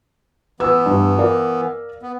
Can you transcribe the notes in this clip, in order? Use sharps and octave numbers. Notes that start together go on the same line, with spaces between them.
E3 B3 B4 E6
G2
A#4 D5 F5
B3